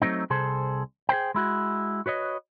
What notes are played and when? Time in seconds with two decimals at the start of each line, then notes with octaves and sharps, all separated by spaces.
0.02 F#3 A3 C4 D#4
0.30 C2 C3 G#4 A4 C5
1.09 G#4 B4 C5 G5
1.34 G#3 E4 F#4
2.06 F#4 B4 C#5 D#5